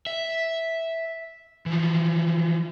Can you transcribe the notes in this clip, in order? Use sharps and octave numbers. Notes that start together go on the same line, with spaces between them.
E5
E3 F3